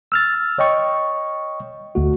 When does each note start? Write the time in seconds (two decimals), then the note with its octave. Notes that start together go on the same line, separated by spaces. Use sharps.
0.12 E6 F6 A6
0.58 C#5 D#5 G5 C#6
1.95 D2 A3 F#4